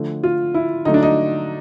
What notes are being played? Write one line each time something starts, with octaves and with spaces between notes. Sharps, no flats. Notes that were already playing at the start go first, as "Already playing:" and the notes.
Already playing: D3 F3 A3
F4
E4
D3 F#3 A3 D#4
D4
D#4